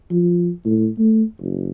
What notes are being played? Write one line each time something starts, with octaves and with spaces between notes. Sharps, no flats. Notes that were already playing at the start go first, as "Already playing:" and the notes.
F3
A2
A3
F#1